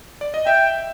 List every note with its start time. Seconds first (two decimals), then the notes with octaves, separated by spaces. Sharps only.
0.21 D5
0.34 D#5
0.47 E5 G5